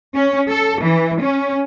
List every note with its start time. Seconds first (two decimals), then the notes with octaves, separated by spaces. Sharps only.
0.14 C#4
0.49 A4
0.82 E3
1.22 C#4